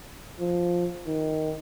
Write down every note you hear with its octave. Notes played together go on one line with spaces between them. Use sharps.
F3
D#3